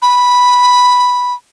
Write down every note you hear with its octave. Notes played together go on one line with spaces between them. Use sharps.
B5